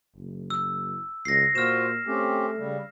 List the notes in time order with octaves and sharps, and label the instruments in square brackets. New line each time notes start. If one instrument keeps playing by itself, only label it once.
[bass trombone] F#1
[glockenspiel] E6
[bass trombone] C#2 [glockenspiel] A#6 C7
[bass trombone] A#2 [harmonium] F4 F#4 C5 [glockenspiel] F6 E7
[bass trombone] A3 [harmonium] C4 C#4 G4
[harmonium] C#3 G3